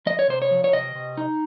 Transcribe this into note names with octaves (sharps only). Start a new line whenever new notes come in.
F3 D#5
C#5
C3 C5
C#5
F3
C#5
C3 D#5
C3
D#4